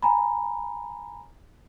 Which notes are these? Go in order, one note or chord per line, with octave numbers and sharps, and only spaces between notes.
G#5 A#5 B5